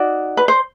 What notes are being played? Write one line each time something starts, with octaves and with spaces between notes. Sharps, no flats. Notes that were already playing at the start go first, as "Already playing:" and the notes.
Already playing: D#4 F#4 D5
B4
C5